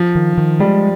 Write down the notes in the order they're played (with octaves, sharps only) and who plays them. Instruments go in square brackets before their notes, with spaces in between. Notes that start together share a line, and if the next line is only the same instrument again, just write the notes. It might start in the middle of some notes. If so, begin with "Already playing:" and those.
Already playing: [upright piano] F3
[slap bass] D#3
D#3
[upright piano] G3 [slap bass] G#3